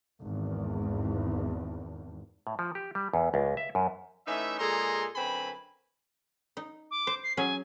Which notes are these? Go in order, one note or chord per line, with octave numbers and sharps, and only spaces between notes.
G#1 E2
A2
F3
G4
G3
E2
C#2
E5
F#2
E3 A3 C#4 D#4 E5
A#2 G#3 G#4 A4 A#5 C6
F#2 D3 C4 B4 G#5 B5
D#4
D6
C5
C7
F#3 C#4 G#4 G#5